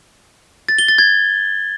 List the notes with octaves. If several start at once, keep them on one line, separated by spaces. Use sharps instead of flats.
A6
G7
A6
G#6